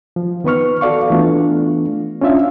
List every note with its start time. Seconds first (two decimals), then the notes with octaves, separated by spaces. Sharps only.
0.16 F3
0.44 D#3 B3 B4 C#6 F6
0.81 F#4 A4 D5 F5 C#6
1.10 E3 A3 B3 D4 F4
2.21 C#4 D4 F4 E5 F5